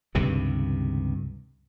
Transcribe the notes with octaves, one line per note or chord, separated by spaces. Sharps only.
C#2 G2 C3 D#3